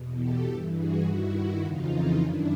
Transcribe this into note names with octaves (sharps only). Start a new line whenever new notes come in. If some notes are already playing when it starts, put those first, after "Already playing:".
Already playing: E2 B2
G4 A4
G2 E3 G4 A4
F#4 G#4
G2 D#3 E4 F#4
F2 C#3 E3 D#4 F4
F#2 D#3 D4 E4